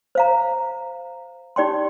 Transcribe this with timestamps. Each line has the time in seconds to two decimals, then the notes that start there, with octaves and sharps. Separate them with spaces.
0.15 C5 F5 A#5
1.56 D#4 G4 D5 G5 C6